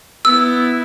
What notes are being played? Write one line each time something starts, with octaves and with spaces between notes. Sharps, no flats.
B3 E4 E6